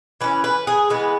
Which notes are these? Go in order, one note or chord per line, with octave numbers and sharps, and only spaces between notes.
E3 C#4 B4
B4
G#4
E3 G#3 B3 B4